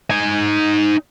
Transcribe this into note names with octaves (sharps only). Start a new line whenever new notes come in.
D#4 G#5